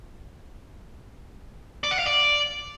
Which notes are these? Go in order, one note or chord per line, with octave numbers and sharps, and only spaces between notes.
D5
F#5
F5
D5